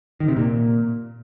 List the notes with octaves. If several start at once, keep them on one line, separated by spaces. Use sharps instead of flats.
D#3
C3
A#2